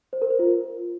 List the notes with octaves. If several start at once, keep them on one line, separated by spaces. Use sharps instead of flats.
C5
A#4
C5
F4